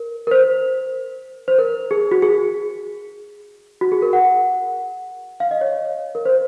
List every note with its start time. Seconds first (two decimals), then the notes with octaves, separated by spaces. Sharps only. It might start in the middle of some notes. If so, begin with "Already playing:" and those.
Already playing: A#4
0.27 A#4
0.31 C5
1.48 C5
1.58 A#4
1.91 G#4
2.11 F#4
2.22 G#4
3.81 F#4
3.92 G#4
4.02 A#4
4.13 F#5
5.40 F5
5.51 D#5
5.61 C#5
6.15 A#4
6.25 C5